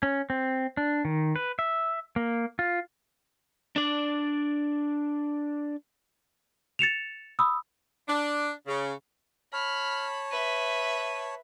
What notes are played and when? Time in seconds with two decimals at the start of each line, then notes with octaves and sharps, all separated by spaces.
0.03 C#4
0.30 C4
0.77 D4
1.05 D#3
1.36 B4
1.59 E5
2.16 A#3
2.59 F4
3.76 D4 D5
6.79 A6 C#7 E7 F7
7.39 B5 D#6 E6
8.09 D4
8.67 C#3
9.53 C#5 A5 B5 F6
10.31 B4 E5 D#7